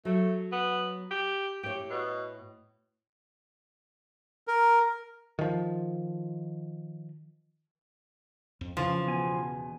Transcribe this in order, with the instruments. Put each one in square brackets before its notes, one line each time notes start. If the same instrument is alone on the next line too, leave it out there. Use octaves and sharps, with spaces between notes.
[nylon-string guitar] F#3 [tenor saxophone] A3
[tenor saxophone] B3
G4
[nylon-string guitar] A2 C#5 [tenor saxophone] G4
[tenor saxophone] B2
[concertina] A#4
[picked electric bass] D#3 F3
[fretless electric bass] F2
[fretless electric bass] C#3 E3 [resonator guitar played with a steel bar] F3
[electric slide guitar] E2 B2 G#5